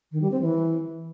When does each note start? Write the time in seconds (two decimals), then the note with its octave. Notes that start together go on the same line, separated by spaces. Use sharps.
0.12 D#3
0.22 G3
0.31 C4
0.41 E3